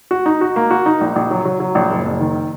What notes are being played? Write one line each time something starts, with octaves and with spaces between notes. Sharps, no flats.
F#4
D#4
F#4
A#3
F#4
D#4
A#1
A#1
F#3
F#3
F#3
A#1
F#1
F#1
D#3